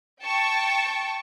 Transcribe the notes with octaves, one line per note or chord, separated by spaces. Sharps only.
G5 A5 C#6